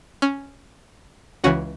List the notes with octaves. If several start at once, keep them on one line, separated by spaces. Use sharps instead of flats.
C#4
C#2 C#3 E3 C#4 F#4